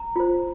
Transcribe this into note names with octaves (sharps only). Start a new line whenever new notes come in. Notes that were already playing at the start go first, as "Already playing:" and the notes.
Already playing: A#5
F4 C5